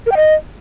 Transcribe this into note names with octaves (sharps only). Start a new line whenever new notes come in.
A#4
G5
D#5